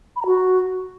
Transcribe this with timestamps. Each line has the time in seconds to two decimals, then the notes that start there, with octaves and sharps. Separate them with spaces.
0.16 B5
0.21 A#5
0.26 F#4